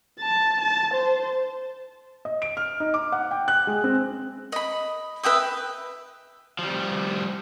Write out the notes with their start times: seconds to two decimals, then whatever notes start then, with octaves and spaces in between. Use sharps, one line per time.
0.20 A5
0.61 A5
0.94 C5
2.25 D#5
2.42 D7
2.57 F6
2.80 D#4
2.94 D6
3.12 F#5
3.31 G5
3.48 F#6
3.67 G#3
3.84 C4
4.52 D#5 B5
5.23 B4 E5 G5 D#6
6.59 F3 G3